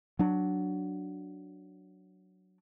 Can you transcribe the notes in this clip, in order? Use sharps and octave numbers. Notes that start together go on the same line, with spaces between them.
F#3 D4